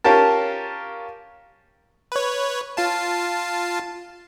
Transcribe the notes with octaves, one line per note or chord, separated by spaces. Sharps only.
C#4 F4 G4 A#4 A5
B4 C#5
F4 F5 A5